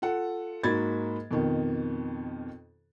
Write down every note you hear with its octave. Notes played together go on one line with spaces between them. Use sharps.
F4 A4 F#5
G#2 A#3 F#4 B5 G#6 A6
F2 B2 D#3